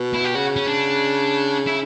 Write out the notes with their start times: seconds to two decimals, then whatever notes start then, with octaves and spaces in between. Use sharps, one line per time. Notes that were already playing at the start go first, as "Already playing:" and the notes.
Already playing: B2
0.14 E4
0.24 G4
0.35 C#3 F#4
0.56 C#4
0.68 D4
1.66 E4